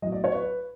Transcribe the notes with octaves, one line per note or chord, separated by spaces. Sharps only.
B1 A2 F#3 D#5
D5
C#5
B4